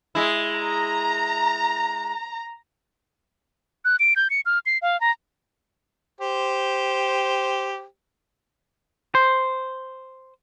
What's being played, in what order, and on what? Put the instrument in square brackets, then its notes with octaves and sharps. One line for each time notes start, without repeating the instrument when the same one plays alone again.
[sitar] G#3 E4
[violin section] A#5
[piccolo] F#6
D7
G6
C#7
F6
C7
F5
A#5
[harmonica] G4 C5
[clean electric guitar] C5